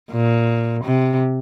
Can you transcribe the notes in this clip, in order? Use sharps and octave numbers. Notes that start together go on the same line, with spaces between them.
A#2
C3